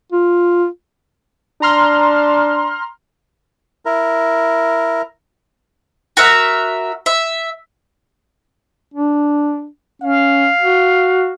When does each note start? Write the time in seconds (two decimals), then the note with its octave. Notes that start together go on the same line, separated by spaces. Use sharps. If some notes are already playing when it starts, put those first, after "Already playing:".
0.12 F4
1.62 D4 A#5 C6 F6
3.85 E4 A#4
6.17 F#4 A#4 E5
7.06 E5
8.94 D4
10.02 C#4 F5
10.61 F#4